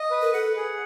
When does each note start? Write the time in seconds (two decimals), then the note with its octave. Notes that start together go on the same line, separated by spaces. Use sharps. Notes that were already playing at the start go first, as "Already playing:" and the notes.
Already playing: D#5
0.11 B4
0.22 A#4
0.34 A4 F#5
0.56 G#4